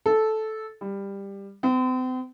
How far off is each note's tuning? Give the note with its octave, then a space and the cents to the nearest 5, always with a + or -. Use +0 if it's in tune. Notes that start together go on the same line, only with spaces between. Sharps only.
A4 -10
G3 +15
C4 -40